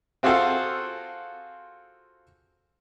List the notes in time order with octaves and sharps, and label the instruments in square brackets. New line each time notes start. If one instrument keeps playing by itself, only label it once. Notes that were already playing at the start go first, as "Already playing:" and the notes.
[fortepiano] C4 F4 F#4 G#4 A4 F5